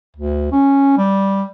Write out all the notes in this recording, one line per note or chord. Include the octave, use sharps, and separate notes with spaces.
D2
C#4
G3